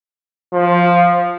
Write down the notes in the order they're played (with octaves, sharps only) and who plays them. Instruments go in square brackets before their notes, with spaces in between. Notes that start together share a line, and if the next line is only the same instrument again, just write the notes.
[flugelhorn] F3